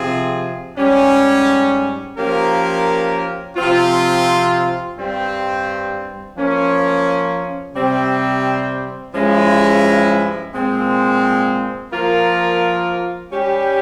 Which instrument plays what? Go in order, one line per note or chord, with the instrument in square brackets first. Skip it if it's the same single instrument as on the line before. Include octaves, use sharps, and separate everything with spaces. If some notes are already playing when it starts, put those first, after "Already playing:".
Already playing: [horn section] C3 F3 C4 F4 G#4
G#2 G3 C#4
F3 A#3 C#4 G4 A#4
C3 F3 C4 F4
G2 G3 C4
F3 A#3 C#4
C3 G3 C4
G2 F3 G#3 C#4 E4
A#2 G#3 C4
F3 A#3 F4 A#4
G3 C#4 G4